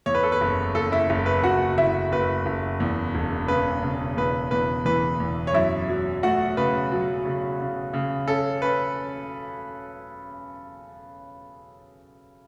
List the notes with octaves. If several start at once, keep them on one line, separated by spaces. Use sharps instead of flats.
E2 C#5
B4
A4
B4
F#1
F#1 A4
E4 E5
F#1
B4
F#1 F#4 F#5
F#1 E4 E5
F#1 B4
F#1
E2
E1
C#3 B4
C#3
E2 B4
E2 B4
E3 B4
E2
C#5
F#2 E4 E5
F#3
A3 F#4 F#5
C#3 B4
F#3
C#3
C#3
C#3
C#4 A4
C#4 B4